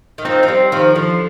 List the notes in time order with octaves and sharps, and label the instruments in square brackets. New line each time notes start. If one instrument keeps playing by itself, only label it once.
[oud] D#3
[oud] F3 [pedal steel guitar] C4 D#4
[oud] F3
[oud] G3 [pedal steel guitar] C4
[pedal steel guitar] D#3 [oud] F3
[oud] D3 [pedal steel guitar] F3